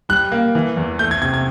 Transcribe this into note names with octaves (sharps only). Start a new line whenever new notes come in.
G3 F#6
A#3
E3
E2
A3 G6
G#6
C3 G#6
G#6